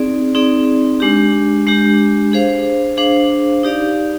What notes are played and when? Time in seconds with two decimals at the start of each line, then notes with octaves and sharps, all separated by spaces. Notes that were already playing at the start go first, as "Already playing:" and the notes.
Already playing: C4 D#4 G#4 D5
0.35 C4 D#4 G#4 D5
1.00 G#3 D4 G4
1.67 G#3 D4 G4
2.32 D4 G#4 C5 F5
2.97 D4 G#4 C5 F5
3.63 D#4 G4 D5 F5